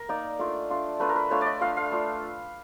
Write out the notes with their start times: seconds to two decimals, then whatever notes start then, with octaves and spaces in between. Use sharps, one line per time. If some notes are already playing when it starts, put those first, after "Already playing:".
Already playing: A#4
0.09 A#3 D#4 D5
0.39 A3 D4 F4
0.70 A3 D4 F4
1.00 A3 D4 F4 B4
1.09 A#4
1.16 B4
1.31 A3 D4 F4 C#5
1.41 D5 D#5
1.61 A3 D4 F4 F5
1.77 F5
1.92 A3 D4 F4